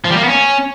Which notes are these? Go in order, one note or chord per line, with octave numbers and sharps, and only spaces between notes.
F3
G3
A#3
B3
C#4